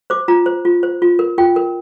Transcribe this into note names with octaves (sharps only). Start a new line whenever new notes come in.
C5 D6
F4 A#5
C5
F4
C5
F4
A#4
F4 G5
A#4